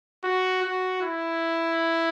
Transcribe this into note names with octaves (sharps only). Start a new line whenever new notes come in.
F#4
F#4
E4